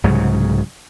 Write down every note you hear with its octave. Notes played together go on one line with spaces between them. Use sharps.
C2 G#2 C#3 F#3